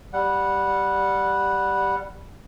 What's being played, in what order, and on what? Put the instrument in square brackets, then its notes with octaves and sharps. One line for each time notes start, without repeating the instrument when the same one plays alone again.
[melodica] G3 F#5